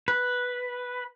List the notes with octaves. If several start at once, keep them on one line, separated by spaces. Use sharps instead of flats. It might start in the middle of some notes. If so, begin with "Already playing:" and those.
B4